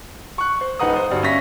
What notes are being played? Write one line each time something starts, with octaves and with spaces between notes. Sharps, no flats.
C#6 F#6
C5
D#1 D#4 B4 F#5 A#5 D#6
C5 D#6
G1 G2 D3 F#3
C#4 E5 F5 A#6 B6